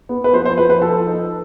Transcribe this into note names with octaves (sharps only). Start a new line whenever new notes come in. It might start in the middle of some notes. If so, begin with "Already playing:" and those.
B3
B4
F3 C5
C5
F3 B4
B4
F3 A4
D#4